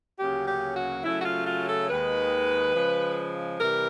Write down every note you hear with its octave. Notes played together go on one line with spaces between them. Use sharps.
D2 C#3 F#3 A#3 C#4 G4
G4
F#4
C#3 F#3 A3 C#4 E4
F#4
F4
F4
A4
D#2 D#3 G#3 B4
C#3 F3 G#3
C3 E3 G3 A#4